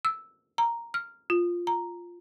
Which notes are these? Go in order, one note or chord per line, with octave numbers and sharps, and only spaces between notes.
E6
A#5
F6
F4
A#5